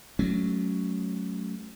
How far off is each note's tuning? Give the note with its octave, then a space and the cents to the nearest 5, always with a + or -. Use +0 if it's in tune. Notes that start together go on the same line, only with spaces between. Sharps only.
F#3 +0 A3 -25 C#4 +0